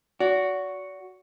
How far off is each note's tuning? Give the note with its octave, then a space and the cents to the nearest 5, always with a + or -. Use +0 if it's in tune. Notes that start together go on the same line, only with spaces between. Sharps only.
F#4 +0 D5 -40